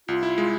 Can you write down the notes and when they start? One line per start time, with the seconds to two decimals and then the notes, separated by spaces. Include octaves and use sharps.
0.08 C2 F4
0.23 E4
0.38 G#3